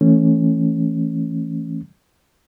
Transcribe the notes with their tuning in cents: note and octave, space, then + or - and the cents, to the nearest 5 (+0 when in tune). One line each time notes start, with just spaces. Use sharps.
E3 +0 A3 +20 C#4 -10